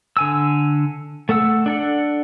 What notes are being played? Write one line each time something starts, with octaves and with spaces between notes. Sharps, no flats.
D3 G#5 E6
A3 A4 F#5 E6
D4 A4 F#5